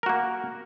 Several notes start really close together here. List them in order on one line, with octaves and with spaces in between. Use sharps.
A#4 F#4 A#3